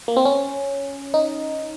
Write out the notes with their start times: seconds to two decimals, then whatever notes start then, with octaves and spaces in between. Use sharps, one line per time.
0.08 A#3
0.17 C4
0.25 C#4
1.14 D#4